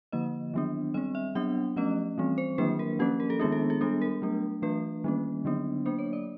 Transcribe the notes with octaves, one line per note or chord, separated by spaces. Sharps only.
D3 F3 A#3 D#5
D#3 F#3 B3 D4
G3 C4 D#5
E5
F#3 B3 D4 F#5
F3 A3 C#4 D#5
E3 G3 C4
C5
D#3 F#3 A#3 D4 B4
A#4
F3 A#3 C#4 G4
A#4
A4
D#3 G#3 B3 D4 G#4
A4
G#4
G3 B3 D4 A4
A#4
F#3 A3 D4
E3 A3 D4 B4
D#3 G3 A#3 C#4
D3 F#3 B3 D4
F#3 A#3 D4 C5
C#5
D5